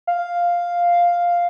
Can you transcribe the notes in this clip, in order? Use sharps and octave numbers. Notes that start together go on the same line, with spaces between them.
F5